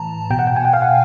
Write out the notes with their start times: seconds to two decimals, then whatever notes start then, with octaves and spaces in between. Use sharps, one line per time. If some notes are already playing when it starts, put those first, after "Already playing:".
Already playing: A2 E3 A5 A#5
0.30 B2 G5
0.39 F#5
0.47 G5
0.56 G#5
0.65 G5
0.73 F5
0.82 F#5